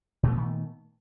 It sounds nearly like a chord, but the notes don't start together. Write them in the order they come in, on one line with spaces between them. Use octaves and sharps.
A#2 A3 B3 D#3